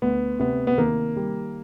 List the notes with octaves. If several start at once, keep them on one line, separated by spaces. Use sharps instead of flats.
D2 B3
C3 B3
B3
D#3 A#3
G3